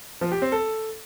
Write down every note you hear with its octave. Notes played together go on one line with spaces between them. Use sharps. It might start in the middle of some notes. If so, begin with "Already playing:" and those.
F3
G4
C4
A4